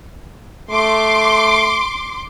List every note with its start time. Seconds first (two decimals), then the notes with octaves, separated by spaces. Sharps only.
0.71 A3 C6 D6